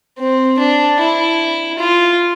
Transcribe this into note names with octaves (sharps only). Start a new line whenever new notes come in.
C4
D4
E4
F4